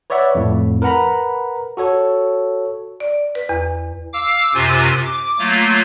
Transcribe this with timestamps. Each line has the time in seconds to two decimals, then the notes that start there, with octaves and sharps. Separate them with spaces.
0.10 B4 C#5 D5 E5 F#5
0.35 F2 A2
0.82 A#4 B4 F#5 A#5 B5
1.77 F#4 A4 C#5
3.00 D5
3.35 B4
3.49 E2
4.13 F5 D6 E6
4.54 F#2 C3 F4 C5 G#5
5.05 D6
5.39 F#3 A3 A#3 F4